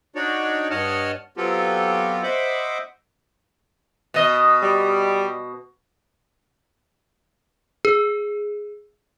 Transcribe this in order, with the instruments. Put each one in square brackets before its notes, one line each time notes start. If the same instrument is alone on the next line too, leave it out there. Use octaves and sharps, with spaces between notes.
[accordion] D4 D#4 F#4 C#5 D5
G2 C#5 D#5 F#5 A5 F6
F#3 B3 C4 F4 G4 A4
C5 D#5 E5 F#5 B5 D6
[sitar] B2 D#5
[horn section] G3
[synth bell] G#4